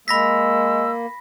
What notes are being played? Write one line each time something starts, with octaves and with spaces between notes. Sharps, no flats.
G#3 A#3 B5 E6 A#6 B6